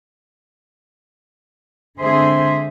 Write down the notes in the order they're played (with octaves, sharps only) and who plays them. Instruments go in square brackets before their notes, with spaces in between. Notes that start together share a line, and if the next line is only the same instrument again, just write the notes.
[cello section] D3 G#3 C4 G#4 C5 E5